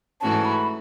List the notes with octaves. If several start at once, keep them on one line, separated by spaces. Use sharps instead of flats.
G#2 E3 A3 C#4 F#4 A5
B5